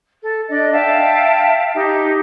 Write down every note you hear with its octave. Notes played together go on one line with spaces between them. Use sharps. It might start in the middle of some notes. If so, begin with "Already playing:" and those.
A4
D4 D5 D#5
E5 F5 G5 A5
D#4 G4